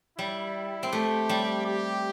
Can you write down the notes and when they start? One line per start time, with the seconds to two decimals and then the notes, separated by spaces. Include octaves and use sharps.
0.18 G3 E4
0.83 C4
0.92 A3 G4
1.29 G3
1.66 G4